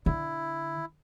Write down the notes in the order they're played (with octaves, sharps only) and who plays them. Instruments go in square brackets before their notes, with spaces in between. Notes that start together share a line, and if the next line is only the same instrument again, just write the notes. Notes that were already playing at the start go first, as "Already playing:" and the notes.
[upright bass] D3 [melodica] E4